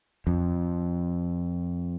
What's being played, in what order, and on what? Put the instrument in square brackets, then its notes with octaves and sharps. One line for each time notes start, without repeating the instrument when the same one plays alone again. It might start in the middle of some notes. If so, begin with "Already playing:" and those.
[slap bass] F2